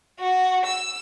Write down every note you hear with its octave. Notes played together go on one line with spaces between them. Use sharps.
F#4
E6